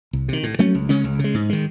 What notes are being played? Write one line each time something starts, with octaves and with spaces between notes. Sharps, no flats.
C2
C3 D#3
A2
F#3 A3 C#4
C#2
C#3 G#3 C#4
C#2
C#3 G#3
G#2
D#3 G#3